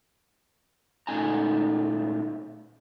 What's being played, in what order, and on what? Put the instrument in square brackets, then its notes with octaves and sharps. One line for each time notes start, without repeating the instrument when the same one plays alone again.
[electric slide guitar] A#2 A3 C#4 D#4 G#5 A#5